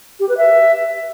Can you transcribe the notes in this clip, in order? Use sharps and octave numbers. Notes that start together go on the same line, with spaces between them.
G4
B4
E5